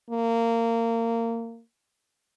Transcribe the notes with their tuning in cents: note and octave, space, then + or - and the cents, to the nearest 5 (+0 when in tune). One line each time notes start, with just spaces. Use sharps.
A#3 -20